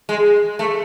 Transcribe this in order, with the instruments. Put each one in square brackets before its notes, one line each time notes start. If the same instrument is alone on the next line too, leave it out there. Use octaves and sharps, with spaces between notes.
[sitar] G#3
A3